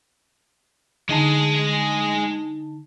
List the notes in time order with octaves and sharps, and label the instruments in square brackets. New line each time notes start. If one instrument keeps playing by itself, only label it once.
[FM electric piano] D3 D#4 A5 [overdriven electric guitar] G#3 G#4